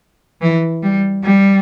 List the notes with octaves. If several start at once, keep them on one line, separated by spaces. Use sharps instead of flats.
E3
G3
G3